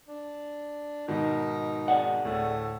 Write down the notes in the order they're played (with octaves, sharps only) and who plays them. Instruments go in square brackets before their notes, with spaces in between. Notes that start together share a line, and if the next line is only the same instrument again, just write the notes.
[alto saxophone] D4
[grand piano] G#2 B2 D#3 [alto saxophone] D#4
[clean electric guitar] G#4 D5 F#5
[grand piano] D2 A2 [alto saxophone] A3